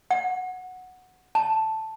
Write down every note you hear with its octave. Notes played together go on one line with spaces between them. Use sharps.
F#5
A5